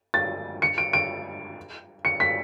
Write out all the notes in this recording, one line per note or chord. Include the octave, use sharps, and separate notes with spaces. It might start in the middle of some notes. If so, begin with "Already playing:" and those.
A6
C#7
D7
D7
C#7
B6